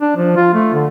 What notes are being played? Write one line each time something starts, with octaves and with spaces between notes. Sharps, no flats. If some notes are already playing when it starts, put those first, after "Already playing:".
D4
F3
F4
A3
D3